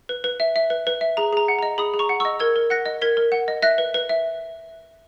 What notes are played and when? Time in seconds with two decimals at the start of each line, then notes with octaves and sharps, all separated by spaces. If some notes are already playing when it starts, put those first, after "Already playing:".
0.09 B4
0.24 B4
0.40 E5
0.56 E5
0.70 B4
0.87 B4
1.01 E5
1.17 G#4 A#5
1.33 G#4 A#5
1.48 F#5
1.59 D#5 A#5
1.78 G#4 B5 D#6
1.94 G#4
1.99 A#5 C#6
2.09 F#5
2.20 D#5 C#6 E6
2.39 A#4 E6 G#6
2.56 A#4
2.70 F#5 F#6 A#6
2.86 D#5
3.02 A#4 G#6 B6
3.17 A#4
3.32 F#5
3.48 D#5
3.62 E5 F#6 A#6
3.78 B4
3.94 B4
4.09 E5